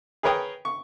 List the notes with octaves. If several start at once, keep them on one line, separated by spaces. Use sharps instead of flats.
G#4 A#4 B4 C#5 G5 D#6
C#6